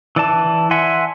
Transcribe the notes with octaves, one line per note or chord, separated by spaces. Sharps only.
E3 D5 A5
E5 F#5 G#5 C6